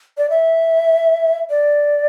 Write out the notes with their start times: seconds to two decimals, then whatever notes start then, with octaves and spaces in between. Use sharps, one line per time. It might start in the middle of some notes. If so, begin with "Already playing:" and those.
0.18 D5
0.30 E5
1.50 D5